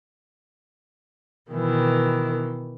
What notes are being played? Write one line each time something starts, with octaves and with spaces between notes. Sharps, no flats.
B2 D#3 E3